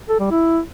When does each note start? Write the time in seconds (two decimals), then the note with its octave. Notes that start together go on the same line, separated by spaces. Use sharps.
0.09 A4
0.20 G3
0.31 E4